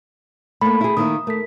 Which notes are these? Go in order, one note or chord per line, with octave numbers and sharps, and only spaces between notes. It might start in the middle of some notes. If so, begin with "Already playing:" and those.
A3 A#3 B5
E4 G#4
D#3 A#3 E4 D#6
A3 A#4 B6